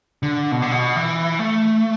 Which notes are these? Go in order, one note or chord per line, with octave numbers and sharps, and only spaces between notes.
D3
B2
D3
B2
E3
A3